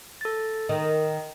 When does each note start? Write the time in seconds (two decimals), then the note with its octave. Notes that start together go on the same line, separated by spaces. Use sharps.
0.21 A4 A6
0.69 D#3 D#5